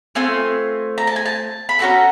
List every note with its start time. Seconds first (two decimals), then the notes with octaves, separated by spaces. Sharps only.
0.15 A3 C4 F4 G#5
0.98 A#5
1.07 A5
1.16 G#5
1.25 A5
1.69 B5
1.79 C#4 F#4 A4 A#5